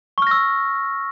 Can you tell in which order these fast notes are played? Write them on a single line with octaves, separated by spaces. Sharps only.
C#6 F6 A#6 E6